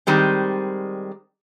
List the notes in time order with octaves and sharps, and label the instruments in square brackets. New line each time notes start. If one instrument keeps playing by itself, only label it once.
[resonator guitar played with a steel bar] D#3 G3 G#3 C4